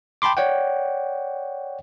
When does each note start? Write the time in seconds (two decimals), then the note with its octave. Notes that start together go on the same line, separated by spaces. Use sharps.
0.22 G5 A5 B5 C6 D6
0.37 C#5 D5 F#5 G5